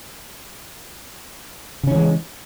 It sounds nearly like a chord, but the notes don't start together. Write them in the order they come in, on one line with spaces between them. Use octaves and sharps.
C#3 C#4 E3 G#3